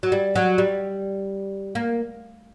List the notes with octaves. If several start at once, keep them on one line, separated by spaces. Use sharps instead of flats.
F#3
G3
F#3
G3
A#3